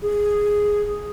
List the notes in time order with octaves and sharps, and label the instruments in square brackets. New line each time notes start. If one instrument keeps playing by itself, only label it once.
[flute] G#4